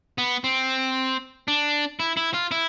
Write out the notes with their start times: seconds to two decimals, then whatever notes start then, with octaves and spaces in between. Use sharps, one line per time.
0.18 B3
0.44 C4
1.48 D4
2.00 E4
2.17 E4
2.34 F4
2.51 E4